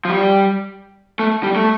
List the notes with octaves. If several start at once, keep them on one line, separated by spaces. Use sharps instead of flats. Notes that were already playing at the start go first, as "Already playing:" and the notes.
F3
G3
A3
G3
A3